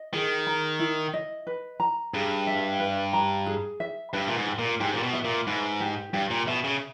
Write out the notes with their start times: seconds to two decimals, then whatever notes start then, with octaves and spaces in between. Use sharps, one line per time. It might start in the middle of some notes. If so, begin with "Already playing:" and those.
Already playing: D#5
0.13 D#3 G#4
0.47 A#5
0.80 E4
1.14 D#5
1.47 B4
1.80 A#5
2.13 G2 G#4
2.47 E5
2.80 B4
3.13 A#5
3.46 G#4
3.80 E5
4.13 G2 B4
4.27 A#2
4.36 G#2
4.47 G4
4.59 A#2
4.80 G#2 G4
4.94 A#2
5.03 B2
5.13 E5
5.24 A#2
5.47 G#2 B4
5.80 G4
6.13 G2 G4
6.30 A#2
6.47 B2 E5
6.64 C#3